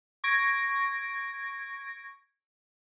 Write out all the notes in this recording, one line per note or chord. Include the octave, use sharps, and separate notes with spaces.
C#6 G#6 A#6 D7